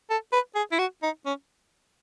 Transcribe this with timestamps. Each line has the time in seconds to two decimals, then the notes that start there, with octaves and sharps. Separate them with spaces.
0.10 A4
0.33 B4
0.55 G#4
0.72 E4
0.79 F#4
1.03 D#4
1.26 C#4